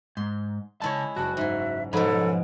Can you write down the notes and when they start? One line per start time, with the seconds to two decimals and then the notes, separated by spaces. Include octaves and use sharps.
0.17 G#2 C6
0.82 C#3 G#3 E4 C#5 A5
1.16 F#1 F#4 D5 A5
1.37 G#2 E5 G#5
1.93 G#2 B2 F3 A4 C#5 G#5 B5